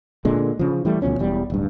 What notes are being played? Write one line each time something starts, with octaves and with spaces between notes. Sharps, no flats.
A#2 D3 G#3
C#3 F3
E3 G3 A3
D2 B2 F3 C#4
E1 E2 G3
D1 G2